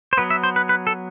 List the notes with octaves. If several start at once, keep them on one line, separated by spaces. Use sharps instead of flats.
C5
F#3 B3 B4
E5
C5
B4
B4
A4